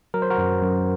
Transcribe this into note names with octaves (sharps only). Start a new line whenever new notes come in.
F#3 A#4
C5
F#4 A#4
F#2
F#2